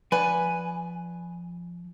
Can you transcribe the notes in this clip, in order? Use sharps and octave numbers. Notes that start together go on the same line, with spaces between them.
F3 B4 D5 F#5 G#5